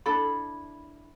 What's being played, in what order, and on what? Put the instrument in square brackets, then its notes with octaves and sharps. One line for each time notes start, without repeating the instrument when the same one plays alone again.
[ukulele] D4 E4 A4 B5